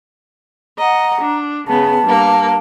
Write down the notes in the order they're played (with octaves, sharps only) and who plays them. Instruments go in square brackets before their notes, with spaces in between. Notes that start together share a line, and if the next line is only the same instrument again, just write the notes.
[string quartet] D#5 F#5 [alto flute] A#5
[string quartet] D4
[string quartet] C#3 B3 [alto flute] A5
[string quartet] G2 A#3